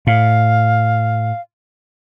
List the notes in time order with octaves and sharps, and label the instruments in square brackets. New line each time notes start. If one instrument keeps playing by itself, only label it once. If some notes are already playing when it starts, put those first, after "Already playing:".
[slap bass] A2 [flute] F5